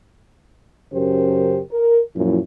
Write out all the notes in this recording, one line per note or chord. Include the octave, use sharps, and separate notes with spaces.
F#2 C#3 G4 A#4 C5
A#4
F#2 A#2 F3 E4